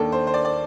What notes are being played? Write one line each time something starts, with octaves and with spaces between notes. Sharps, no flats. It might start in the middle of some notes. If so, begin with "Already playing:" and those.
Already playing: D#2 D#3 A#3 D4 A4
C5
C5
D5
D5